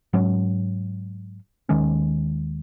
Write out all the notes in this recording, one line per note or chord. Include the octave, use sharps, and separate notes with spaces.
G#2 F#3 C#4
D#2 D#3 G#3 C#4